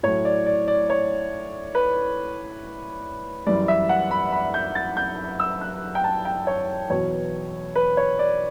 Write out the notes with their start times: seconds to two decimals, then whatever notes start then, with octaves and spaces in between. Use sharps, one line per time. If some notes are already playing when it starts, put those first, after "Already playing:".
0.03 A2 F#3 C#5
0.25 D5
0.46 D5
0.68 D5
0.90 C#5
1.75 B4
3.47 F#2 E3 G3 D5
3.68 E5
3.89 F#5
4.11 B5
4.32 B5
4.54 G6
4.75 A6
4.97 G6
5.40 E6
5.61 F#6
5.95 G5
6.04 A5
6.25 G5
6.47 C#5
6.90 E2 B2 F#3 C#5
7.75 B4
7.97 C#5
8.19 D5